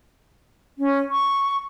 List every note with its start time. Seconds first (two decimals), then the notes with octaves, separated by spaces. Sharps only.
0.78 C#4
1.11 C#6